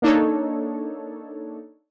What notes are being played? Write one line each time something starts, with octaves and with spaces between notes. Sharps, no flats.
A#3 D4 D#4 A4 C#5